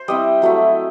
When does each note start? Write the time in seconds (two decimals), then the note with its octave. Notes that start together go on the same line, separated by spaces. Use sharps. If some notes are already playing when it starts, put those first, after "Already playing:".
Already playing: C5
0.08 G3 C4 E4 D#5
0.42 F#3 A3 E4